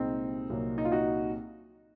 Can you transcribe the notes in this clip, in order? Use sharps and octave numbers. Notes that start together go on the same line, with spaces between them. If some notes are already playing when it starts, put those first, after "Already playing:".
Already playing: C2 A#2 G#3 C4 D#4
C2 A#2 F#3 A#3
D#4
F4
D#4 F#4